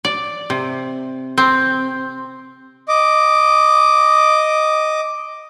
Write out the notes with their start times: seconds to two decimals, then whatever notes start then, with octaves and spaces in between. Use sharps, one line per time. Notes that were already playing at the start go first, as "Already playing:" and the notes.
0.05 D5
0.50 C3
1.38 C4
2.88 D#5 D6